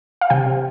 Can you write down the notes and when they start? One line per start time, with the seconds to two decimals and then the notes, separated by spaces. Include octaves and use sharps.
0.21 F5
0.30 C3 G5
0.46 C3